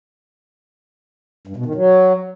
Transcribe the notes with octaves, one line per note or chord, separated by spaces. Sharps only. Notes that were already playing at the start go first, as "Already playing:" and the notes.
G2
B2
D#3
F#3